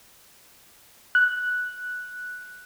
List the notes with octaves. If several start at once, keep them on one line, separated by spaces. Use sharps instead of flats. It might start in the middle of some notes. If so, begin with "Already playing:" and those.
F#6